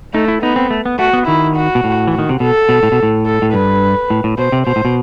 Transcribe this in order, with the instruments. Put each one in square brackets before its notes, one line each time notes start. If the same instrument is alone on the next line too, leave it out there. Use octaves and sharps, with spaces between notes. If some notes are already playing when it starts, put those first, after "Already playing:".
[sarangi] A3 [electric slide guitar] D#4
[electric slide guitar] E4
[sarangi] B3 [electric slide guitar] D#4
[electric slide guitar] C4
A3
B3
[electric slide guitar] A3 [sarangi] F#4
[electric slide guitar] B3
[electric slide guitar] D#3 [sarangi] E4
[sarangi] F#4
[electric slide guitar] B2
A2
[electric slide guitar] E3 [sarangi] F#4
[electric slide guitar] D#3
C3
[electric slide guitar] B2 [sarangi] A4
[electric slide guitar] B2
A2
B2
A2
[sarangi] A4
[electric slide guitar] A2
[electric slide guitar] G2 [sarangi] B4
[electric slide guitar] A2
A2
[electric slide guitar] B2 [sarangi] C5
[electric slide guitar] C3
[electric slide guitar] B2 [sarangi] C5
[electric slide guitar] A2
B2